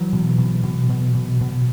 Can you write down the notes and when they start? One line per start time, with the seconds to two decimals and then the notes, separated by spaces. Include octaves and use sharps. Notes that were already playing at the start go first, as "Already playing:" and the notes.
Already playing: E3 F#3
0.13 B2
0.38 B2
0.64 B2
0.89 B2
1.15 B2
1.41 B2